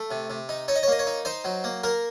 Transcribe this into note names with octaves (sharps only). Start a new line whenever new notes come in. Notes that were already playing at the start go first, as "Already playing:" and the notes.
Already playing: A3
C3
C3
D#4
D#4 C#5
D#5
C#5
A#3 D#5
C#5
D#4
D#4 C5
F#3
A#3
A#3 A#4